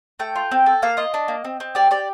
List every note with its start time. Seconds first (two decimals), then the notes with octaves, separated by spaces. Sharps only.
0.19 A3 G5
0.36 F4
0.51 C4
0.66 A4
0.82 A#3 F5
0.97 F4 D#5
1.14 D4
1.28 A#3
1.44 C4
1.60 C4
1.75 G4 D5
1.91 G4 D5